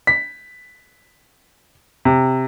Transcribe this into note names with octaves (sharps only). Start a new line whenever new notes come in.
B6
C3